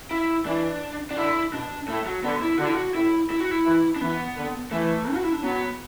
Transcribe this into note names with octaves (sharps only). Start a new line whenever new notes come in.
E4
E3 D4
D4
D3 E4
B2 D4
A2 A3
F#3
D3 B3
E4
D3 F#4
E4
F#4
A2 E4
E4
F#4
E4
E3
D4
E3 B3
D3
E3 A3
F#4
E4
D4
F#3 B3